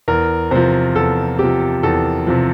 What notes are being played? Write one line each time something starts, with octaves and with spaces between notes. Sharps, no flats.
E2 A#4
C3 F3 C5
E2 A4
C3 F3 G4
E2 A4
C3 F3